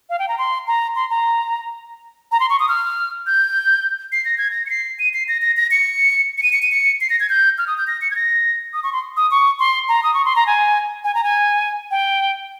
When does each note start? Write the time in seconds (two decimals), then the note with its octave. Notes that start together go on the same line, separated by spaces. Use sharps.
0.10 F5
0.19 G5
0.28 A#5
0.38 C6
0.67 A#5
0.95 C6
1.10 A#5
2.32 A#5
2.40 C6
2.50 C#6
2.59 D#6
2.68 F6
3.26 G6
4.12 C7
4.25 A#6
4.38 G#6
4.51 A#6
4.66 C#7
4.70 C7
4.99 D#7
5.13 C7
5.28 A#6
5.42 A#6
5.57 A#6
5.71 C#7
6.38 C#7
6.43 D#7
6.52 C#7
6.62 D#7
6.72 C#7
7.01 C7
7.10 A#6
7.20 G#6
7.29 G6
7.58 F6
7.67 D#6
7.77 G6
7.87 A#6
8.01 C#7
8.11 G#6
8.16 A#6
8.73 D#6
8.83 C#6
8.93 C6
9.17 D#6
9.31 C#6
9.59 C6
9.88 A#5
10.03 D#6
10.14 C#6
10.25 C6
10.36 A#5
10.47 G#5
11.04 G#5
11.14 A#5
11.23 G#5
11.91 G5